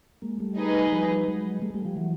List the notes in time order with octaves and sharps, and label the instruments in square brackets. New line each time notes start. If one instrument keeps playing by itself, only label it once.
[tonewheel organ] G#3 A#3
G3 A3
[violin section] D#4 G#4 B4 D#5
[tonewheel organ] G#3
F3 G3
F#3 G#3
G3 A3
G3 A3
F3 G3
E3 F#3